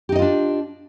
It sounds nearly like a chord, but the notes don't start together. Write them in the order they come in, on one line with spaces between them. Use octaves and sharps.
G4 D#4 D#5 F4 D4